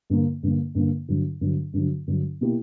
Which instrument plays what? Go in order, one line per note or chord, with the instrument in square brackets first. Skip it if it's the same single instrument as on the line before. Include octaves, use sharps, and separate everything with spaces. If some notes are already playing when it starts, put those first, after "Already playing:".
[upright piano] G2 D3 A#3
G2 D3 A#3
G2 D3 A#3
G2 D3 F#3
G2 D3 F#3
G2 D3 F#3
G2 D3 F#3
B2 A#3 E4 G4